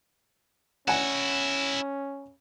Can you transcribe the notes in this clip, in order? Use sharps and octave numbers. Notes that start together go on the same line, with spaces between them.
C#4 E4 F#4 F#5 G#5